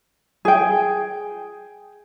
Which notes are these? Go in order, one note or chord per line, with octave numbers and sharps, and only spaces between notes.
G#4 G5